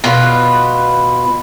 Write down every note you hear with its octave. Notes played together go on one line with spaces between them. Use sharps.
B2 F4 F#4 B4